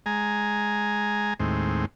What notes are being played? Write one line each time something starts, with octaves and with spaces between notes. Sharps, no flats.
G#3 G#5 A#5
D#2 A2 G#3 C4